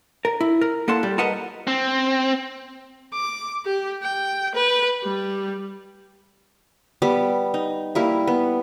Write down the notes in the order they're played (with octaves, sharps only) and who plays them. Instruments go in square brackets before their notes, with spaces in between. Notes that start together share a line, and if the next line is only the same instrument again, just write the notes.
[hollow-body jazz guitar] A#4
E4
A#4
A#3 E4 A4 F#5 A5 C6
G3
A#4 B4 D#5 F#5 A5 A#5
[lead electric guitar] C4
[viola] D6
G4
G5
B4
G3
[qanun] G3 B3 D6
D#4
G3 A#3 E4
B3